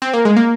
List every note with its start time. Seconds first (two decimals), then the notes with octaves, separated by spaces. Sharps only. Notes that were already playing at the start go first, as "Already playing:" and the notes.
0.02 C4
0.14 A#3
0.25 G#3
0.36 A#3